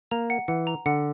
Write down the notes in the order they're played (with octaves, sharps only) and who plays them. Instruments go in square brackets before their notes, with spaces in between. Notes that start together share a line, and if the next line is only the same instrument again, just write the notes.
[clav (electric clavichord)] A#3 [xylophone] A#5
[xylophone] F#5
[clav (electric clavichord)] E3 [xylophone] F#5
[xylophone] A#5
[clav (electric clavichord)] D3 [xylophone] F#5